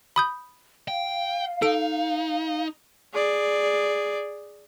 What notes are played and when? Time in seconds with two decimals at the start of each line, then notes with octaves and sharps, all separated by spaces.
0.16 B5 D#6 G6
0.88 F5 G5
1.62 D#4 A4 D7
3.14 G#4 D5